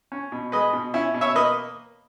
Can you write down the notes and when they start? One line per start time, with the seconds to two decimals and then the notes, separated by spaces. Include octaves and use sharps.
0.12 C#4
0.32 B2
0.52 G#3 B4 D#5
0.73 B2
0.94 C#4 E4
1.14 B2
1.21 C#5 E5
1.35 A#3 B4 D#5